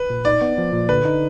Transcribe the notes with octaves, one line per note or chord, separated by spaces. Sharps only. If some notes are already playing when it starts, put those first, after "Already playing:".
Already playing: B4
A#2
D#4 D5
B3
F3
A#2
D3 B4
D#4